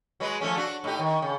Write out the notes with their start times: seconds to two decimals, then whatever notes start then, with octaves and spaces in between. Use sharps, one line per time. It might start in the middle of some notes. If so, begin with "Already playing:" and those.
0.20 F#3 G#3 B4
0.41 F3 A3 C#4
0.57 D4 F#4
0.84 A2 D#4 G4
0.99 D#3
1.22 C#3